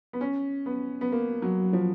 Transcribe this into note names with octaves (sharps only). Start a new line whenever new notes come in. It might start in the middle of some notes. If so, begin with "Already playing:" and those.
B3
C#4
B3
B3
A#3
F#3
F3